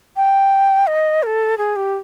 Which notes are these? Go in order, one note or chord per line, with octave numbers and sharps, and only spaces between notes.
G5
D#5
A#4
A4
G#4
G4